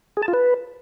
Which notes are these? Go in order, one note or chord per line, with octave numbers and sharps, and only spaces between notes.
G#4
A5
F4
B4